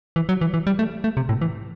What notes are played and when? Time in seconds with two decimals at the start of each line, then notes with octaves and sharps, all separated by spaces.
0.16 E3
0.29 F#3
0.41 E3
0.54 E3
0.67 G3
0.79 A3
1.04 A3
1.17 C3
1.29 A2
1.42 E3